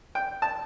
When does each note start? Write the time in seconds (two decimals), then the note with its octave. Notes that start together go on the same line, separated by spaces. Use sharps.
0.15 G5
0.42 A5